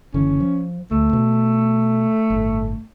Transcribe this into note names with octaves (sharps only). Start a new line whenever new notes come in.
F#1 D3 E3 C#4
F3
D2 A3
B2
G1 A2